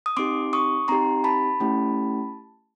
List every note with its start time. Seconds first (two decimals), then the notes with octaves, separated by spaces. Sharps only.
0.06 D#6
0.17 C4 D#4 G4 C6 D6
0.53 C#6 D#6
0.88 C4 D#4 G4 A#5 C6
1.24 A5 B5
1.60 A3 C#4 E4 G4